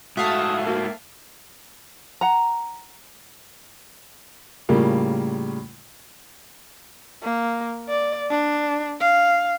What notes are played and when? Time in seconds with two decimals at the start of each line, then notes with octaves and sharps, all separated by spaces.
0.17 G#2 A3 F#4 E5 F5 A5 D#6
0.67 A#3 F#4
2.21 F#5 A#5
4.69 A2 C#3 G3 A#3 F4
7.23 A#3
7.89 D5
8.30 D4
9.01 F5